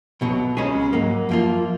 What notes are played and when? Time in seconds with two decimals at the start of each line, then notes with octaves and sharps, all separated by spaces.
0.21 B1 B2 F#3
0.57 C#2 C#3 G#3 C#4 G#4
0.93 G#2 F#3 A#3
1.29 F#2 F3 A#3 F4